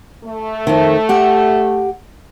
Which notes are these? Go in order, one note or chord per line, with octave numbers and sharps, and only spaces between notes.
A3
F2 D#3
G4 F#5